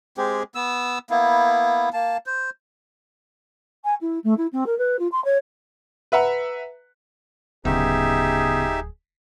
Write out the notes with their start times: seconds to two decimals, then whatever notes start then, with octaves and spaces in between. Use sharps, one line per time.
0.17 G#3 C4 G4 G#4
0.55 B3 E6
1.10 A#3 B3 E4
1.93 A#3 A5
2.26 C5
3.84 G#5
4.01 E4
4.24 A3
4.37 E4
4.52 C4
4.66 A#4
4.78 B4
4.99 F4
5.12 C6
5.24 C#5
6.12 B4 E5 F#5 A#5
7.65 D1 C#3 B3 D#4 G4 G#4 E5